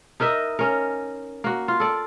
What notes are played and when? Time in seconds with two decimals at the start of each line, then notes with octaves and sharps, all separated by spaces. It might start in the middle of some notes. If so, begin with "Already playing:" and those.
0.20 D#4 A#4 D#5 E5
0.59 C#4 A#4
1.44 A#3 F#4
1.68 F4
1.80 A4 D5